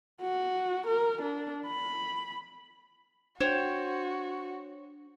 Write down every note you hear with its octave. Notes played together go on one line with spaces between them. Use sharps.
F#4
A#4
D4
B5
D4 F#4 C5 C#5 G5